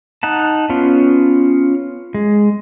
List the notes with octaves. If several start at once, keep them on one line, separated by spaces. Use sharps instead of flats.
D#4 F#5 A5
B3 C#4 F4
G#3